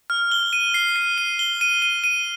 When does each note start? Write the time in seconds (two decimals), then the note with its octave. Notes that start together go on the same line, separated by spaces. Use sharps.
0.10 F6
0.32 G7
0.53 D#7
0.74 C7
0.96 C7
1.18 D#7
1.39 G7
1.61 D#7
1.82 D#7
2.04 D#7